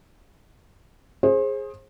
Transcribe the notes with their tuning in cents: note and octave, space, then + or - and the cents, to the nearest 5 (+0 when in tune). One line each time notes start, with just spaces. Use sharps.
G#4 +0 C5 +35